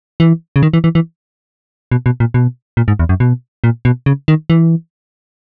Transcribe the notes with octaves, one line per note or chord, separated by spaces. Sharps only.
E3
C#3
D#3
E3
E3
E3
B2
B2
A#2
B2
A#2
G#2
E2
F#2
B2
A#2
B2
C#3
D#3
E3